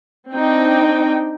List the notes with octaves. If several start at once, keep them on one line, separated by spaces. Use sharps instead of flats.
C4 D4 D#4 G5